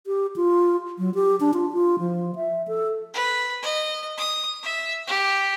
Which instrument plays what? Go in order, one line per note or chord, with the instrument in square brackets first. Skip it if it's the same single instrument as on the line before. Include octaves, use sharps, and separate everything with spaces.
[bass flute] G4
F4
F#3
G4
D4
F4
F4
F3
E5
A4
[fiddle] B4
D#5
D#6
E5
G4